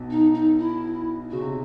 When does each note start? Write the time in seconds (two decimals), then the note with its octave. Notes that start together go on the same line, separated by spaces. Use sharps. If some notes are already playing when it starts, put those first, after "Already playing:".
Already playing: B1 B2
0.10 D#4
0.34 D#4
0.58 E4
1.31 C#3 F#4
1.41 C3